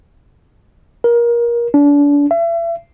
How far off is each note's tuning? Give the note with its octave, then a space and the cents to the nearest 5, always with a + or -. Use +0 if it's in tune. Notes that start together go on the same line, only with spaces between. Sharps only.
A#4 +25
D4 -35
E5 +35